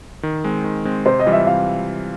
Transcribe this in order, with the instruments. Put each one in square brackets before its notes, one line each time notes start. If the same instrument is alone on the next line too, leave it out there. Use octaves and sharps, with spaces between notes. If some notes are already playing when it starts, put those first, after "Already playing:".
[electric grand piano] D#3
G#3 C4
D#3
G#3 C4
[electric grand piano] C3 [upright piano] C5
[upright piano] D#5
[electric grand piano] E3 G3 C4 F4
[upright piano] E5
[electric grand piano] C3 [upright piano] F5